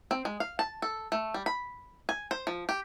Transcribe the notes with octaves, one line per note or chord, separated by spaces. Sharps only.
C4
G#3
F5
A5
A4
A3
G3
B5
G#5
C5
F3
G4